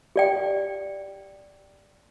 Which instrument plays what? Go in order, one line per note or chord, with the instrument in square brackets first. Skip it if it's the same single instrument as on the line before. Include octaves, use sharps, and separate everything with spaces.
[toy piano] G4 D5 G5